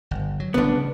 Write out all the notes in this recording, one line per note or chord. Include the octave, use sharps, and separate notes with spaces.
G1
F#3
A1 D3 G3 B3 D4
C#3